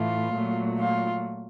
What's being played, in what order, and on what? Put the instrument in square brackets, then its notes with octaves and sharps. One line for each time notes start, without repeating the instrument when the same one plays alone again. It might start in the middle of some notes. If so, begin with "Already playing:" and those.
Already playing: [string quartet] A2 E3 A3 F4
A#2 F#3 A3
F4